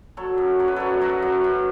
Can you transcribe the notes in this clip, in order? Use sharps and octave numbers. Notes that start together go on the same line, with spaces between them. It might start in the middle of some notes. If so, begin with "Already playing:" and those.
F#3 A4 C#5
F#2
F#3 C#5
B4
F#2 A4 C#5
F#3 F#4 B4
F#2
F#2